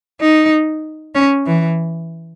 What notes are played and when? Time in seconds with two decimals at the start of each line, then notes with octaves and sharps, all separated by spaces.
0.21 D#4
1.15 C#4
1.46 E3